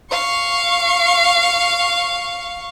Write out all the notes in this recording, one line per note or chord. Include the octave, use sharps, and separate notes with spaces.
F5 C#6